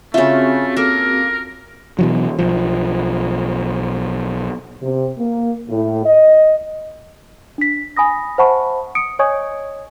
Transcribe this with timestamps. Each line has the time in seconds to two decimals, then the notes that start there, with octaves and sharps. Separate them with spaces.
0.14 C#3 A3 C4 C#4 F4 F#4 G#4 E5
0.77 A#3 A4 A#4
1.99 B2 E3 F#3
2.39 B1 F3
4.81 C3
5.17 A#3
5.69 A2
6.05 D#5
7.58 D4 B6
7.96 G#5 B5 D#6 A#6
8.38 C5 E5 F#5 A5 B5 C#6
8.95 D#6 C#7 D7
9.19 C#5 D#5 G#5 C#6 D#6 G#6